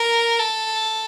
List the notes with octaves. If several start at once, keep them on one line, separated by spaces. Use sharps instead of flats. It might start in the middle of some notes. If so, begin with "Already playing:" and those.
Already playing: A#4
A4